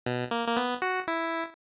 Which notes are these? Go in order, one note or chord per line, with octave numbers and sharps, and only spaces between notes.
B2
A#3
A#3
B3
F#4
E4